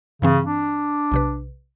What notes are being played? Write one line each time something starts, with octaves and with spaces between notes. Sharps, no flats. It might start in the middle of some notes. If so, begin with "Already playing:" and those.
G2 C#3 E3 C4
D4
B1 C3 B4